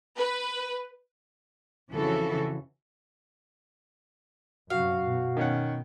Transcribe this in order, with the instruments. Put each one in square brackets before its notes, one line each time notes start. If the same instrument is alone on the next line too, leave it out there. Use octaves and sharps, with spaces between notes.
[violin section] B4
[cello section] F2 C#3 E3 F#4 A4
[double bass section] F#2 C3 [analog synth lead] F#4 [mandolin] F5
[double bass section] B2
[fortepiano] D#3 C#4 F#5